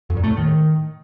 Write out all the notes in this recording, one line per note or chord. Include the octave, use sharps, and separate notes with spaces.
F2
A#2
A3
A2
D#3